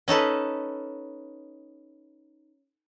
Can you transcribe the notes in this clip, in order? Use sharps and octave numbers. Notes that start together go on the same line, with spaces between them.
C#4 D#4 A4 B4